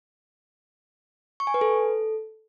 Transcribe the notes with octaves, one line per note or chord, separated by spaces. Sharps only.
C#6
G#5
B4
A4